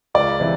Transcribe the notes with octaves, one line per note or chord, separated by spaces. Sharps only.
C#2 D5
C3 E3